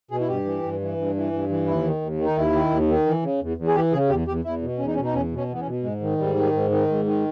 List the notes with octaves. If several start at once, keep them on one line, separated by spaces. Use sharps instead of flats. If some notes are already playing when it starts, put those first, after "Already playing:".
B2 G#4
E4
G2 G4
E3
G2
E3
G2
E3
G2
E3
D#2 E4
D#3
D#2
D#3
D#4
D#2 E4
D#3
D#2
D#3
E3
C#3
E2
E2
G#4
E3 G4
C#3 G#4
E2 G4
E2 G4
E2 E4
B2
E2 C#4
D#4
C#4
B2
D#4
E2 C#4
B2
C#4
E2 B3
C#4
B2
G#2 G#3
D#3
G#2 G3
D#3
G#2
D#3
G#2
D#3